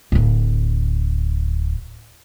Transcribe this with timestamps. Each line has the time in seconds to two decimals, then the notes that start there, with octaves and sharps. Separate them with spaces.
0.12 D1 G#1